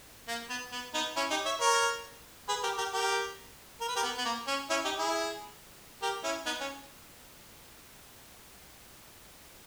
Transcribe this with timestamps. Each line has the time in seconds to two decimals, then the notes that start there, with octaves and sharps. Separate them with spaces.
0.28 A#3
0.49 B3
0.72 B3
0.94 B3 D#4
1.16 C#4 E4
1.30 D#4 G4
1.45 C#5 E5
1.60 A#4 C#5
2.48 G#4 B4
2.63 G4 A#4
2.78 G4 A#4
2.93 G4 A#4
3.81 A#4
3.88 B4
3.96 G4 A#4
4.03 B3
4.18 B3
4.25 A#3
4.47 C#4
4.69 C#4 E4
4.84 D#4 G4
4.99 E4 G#4
6.02 G4 A#4
6.24 C#4 E4
6.46 B3 D#4
6.60 C#4